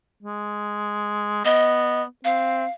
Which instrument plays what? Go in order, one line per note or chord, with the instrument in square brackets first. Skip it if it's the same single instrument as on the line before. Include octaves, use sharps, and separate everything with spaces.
[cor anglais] G#3
[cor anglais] B3 [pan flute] D#5
[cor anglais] C4 [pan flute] F5